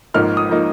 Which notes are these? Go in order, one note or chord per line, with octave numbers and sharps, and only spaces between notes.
G#1 G#2 F3 A#3 D#4 F6
D#6
F3 A#3 D#4